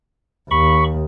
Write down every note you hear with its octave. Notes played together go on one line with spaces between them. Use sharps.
D#2 B5 C#6